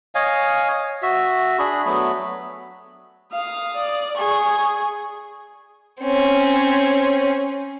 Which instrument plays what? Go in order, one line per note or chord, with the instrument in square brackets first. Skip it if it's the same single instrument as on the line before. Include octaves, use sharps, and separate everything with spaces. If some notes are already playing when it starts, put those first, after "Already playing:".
[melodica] C#5 D#5 F5 G#5
F#4 E5
D4 G#4 B5
F#3 A3 B3 B5
[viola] F5 [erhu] D#6
[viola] D5
[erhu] G#4 [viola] C#6
[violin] C4 C#4